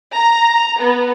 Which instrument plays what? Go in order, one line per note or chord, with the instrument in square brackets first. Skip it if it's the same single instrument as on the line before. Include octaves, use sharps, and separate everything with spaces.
[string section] A#5
B3